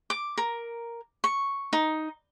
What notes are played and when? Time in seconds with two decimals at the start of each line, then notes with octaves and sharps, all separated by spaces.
0.10 D6
0.38 A#4
1.24 C#6
1.73 D#4